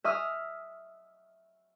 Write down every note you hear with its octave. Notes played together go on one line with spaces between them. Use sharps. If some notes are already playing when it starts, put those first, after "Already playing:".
E5 D#6 F6